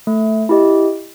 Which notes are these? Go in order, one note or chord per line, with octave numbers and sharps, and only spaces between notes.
A3
E4 G4 D#5